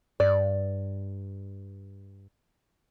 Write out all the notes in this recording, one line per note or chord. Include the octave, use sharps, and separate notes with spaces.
G2 D5